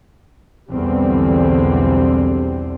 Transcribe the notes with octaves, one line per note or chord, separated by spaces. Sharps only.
B1 E2 D3 G3 C4